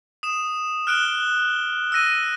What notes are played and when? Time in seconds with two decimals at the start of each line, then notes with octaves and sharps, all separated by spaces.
0.23 D#6 E7
0.87 F6 F#6 D7 E7 G7
1.92 E6 F#6 A#6 D#7